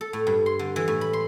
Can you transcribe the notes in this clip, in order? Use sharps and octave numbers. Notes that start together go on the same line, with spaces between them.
A4
A2
G2
C6
D3
E3
A2
B5
C6